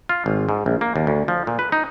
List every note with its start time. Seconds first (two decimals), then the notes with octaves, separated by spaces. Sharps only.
0.09 F4
0.26 G#1
0.49 G#2
0.66 A#1
0.81 A#3
0.96 D#2
1.07 D2
1.28 F3
1.47 A#2
1.59 B4
1.72 D#4